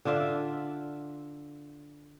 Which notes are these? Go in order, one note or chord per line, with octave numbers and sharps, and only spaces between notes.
D3 D4 F4 E5